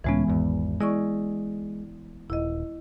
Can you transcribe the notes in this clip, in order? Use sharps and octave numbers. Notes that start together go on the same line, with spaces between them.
C#2 A2 E3 G#3 B3 C#4
G#1 E2
G#3 E4 D5 C#6
D#1 E4 D#5